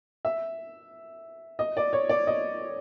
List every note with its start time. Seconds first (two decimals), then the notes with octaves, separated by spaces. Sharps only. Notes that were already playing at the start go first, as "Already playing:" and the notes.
0.25 E5
1.59 D#5
1.77 D5
1.93 C#5
2.09 D5
2.27 D#5